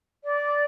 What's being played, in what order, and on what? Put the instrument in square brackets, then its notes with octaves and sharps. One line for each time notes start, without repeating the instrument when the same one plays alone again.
[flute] D5